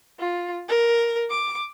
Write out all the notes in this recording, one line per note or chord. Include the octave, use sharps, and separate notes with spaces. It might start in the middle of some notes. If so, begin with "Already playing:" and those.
F4
A#4
D6